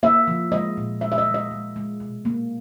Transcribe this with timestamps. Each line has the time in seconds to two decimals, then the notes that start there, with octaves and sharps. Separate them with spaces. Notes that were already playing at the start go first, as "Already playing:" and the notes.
0.03 A#3 E5
0.27 F3
0.52 G#3 D#5
0.77 A#2
1.01 G#3 E5
1.12 E5
1.18 D#5
1.26 G#3
1.34 D#5
1.51 G#3
1.76 G#3
2.00 B2
2.25 A#3